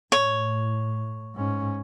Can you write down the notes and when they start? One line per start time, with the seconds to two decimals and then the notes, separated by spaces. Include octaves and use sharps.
0.12 A2 C#5
1.35 G#2 C#4